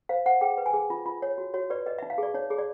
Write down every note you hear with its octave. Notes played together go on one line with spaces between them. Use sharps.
C5 F5
C5 F#5
G#4 G5
B4
G#5
G#4
F4
F4
C#5
F#4
F#4 C#5
B4 D5
B4 D#5
D#4 E5
F5
G#4 D5
D#4 C#5
G#4
D5